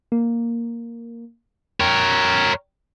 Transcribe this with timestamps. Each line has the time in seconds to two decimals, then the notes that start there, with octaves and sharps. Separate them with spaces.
0.12 A#3
1.80 A#4 C#5 G5